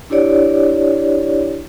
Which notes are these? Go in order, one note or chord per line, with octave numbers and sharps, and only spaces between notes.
D4 E4 G4 C#5 D5